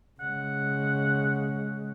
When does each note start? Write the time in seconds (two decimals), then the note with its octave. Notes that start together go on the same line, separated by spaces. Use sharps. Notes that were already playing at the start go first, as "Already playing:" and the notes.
0.20 C#3 G#3 F#5